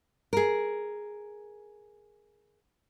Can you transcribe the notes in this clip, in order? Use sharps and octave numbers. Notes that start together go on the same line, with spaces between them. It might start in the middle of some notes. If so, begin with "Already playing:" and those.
G#4 A#4